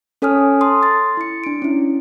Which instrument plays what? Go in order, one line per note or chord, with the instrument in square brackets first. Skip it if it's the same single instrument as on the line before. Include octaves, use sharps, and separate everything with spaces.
[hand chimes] C#4 A4 C#5 G#5 D#6 F6
A4 A5 C6 D#6
C6 A6
E4 C#7
D4 D7
C#4 E4